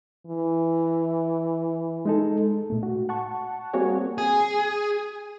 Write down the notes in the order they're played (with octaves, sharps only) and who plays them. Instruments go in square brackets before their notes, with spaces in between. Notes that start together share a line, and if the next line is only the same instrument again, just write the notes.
[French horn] E3
[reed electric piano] G#3 D#4 A4
[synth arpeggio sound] A#2 A3
F#4
F#5 A5 C#6
G3 A#3 C4 F#4 G#4 C#5
[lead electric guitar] G#4